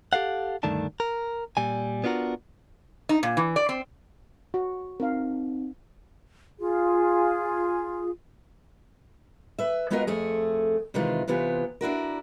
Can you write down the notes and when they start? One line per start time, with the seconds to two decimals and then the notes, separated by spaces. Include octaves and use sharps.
0.13 G4 A4 F5 F#5
0.63 D2 G2 D#3 A3 D4 A5
1.00 A#4
1.57 A#2 G3 G#5
2.04 B3 D4 F4 F#4 A#4
3.09 D#4
3.23 A#2
3.37 E3
3.56 D5
3.69 C4
4.54 F#4
5.00 C4 D#4 A#4 F5
6.59 F4 G#4
9.59 B4 E5
9.90 G#3 B3 F4 F#4 A#4 D#5
10.07 F2 A3 G#4
10.94 C3 D#3 E3 G#3 F4
11.28 C3 E3 B3 F4 G4
11.81 D4 E4 F#4 A#4